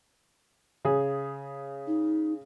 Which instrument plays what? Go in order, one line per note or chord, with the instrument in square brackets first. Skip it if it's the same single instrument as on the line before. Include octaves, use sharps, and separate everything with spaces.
[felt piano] C#3 G#4
[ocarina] D#4